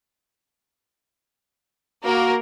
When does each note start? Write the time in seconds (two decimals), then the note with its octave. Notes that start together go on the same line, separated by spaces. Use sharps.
2.05 A#3 F#4 A#4